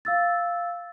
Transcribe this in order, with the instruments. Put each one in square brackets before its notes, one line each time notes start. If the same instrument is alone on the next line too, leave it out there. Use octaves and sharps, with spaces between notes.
[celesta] F5 E6 A6